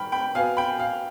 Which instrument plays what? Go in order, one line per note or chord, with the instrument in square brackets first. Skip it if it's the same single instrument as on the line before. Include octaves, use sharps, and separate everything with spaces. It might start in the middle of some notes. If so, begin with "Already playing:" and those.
Already playing: [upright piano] G2 D#3 G#3 G5 B5 F6
G5 B5
B2 B3 F5 G#5
G5 B5
F5